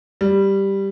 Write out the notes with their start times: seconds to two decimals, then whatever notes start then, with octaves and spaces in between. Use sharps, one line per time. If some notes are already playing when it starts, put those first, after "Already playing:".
0.21 G3